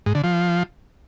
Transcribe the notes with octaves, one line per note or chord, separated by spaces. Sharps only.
G#2
D3
F3